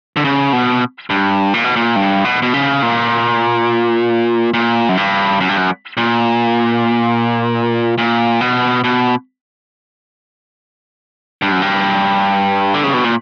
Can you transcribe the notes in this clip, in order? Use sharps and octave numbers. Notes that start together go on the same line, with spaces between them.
D3
C#3
B2
G2
A#2
B2
A#2
G2
B2
B2
C#3
A#2
A#2
F#2
G2
F#2
G2
F#2
A#2
A#2
B2
B2
G2
F#2
G2
D3
C#3
B2
A#2